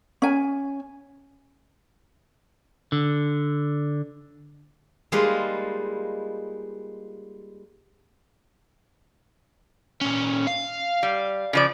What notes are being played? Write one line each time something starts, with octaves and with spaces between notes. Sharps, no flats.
C#4 G#5
D3
G3 G#3 A#3 D#4 F4 B4
A#2 C#4
F5
G3
C#3 F3 D5